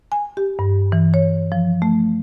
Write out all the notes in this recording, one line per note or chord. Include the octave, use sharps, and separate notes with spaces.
G#5
G4
G2
E3
C#5
F3
A3